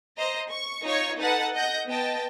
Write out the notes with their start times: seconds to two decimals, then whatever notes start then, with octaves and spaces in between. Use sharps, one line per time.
0.17 C5 D#5 A#5
0.49 C#6
0.83 D#4 F4 C#5 C#6
1.18 D#4 A4 B4 F#5 A5
1.55 D#5 F#5 G6 A#6
1.87 B3 D#5 G5 A5